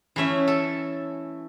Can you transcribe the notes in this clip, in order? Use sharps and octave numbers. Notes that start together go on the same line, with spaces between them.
E3 A3 C#4 E5
A4